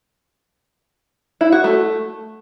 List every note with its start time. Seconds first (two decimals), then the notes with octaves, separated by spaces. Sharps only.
1.41 E4
1.52 F#4
1.64 A3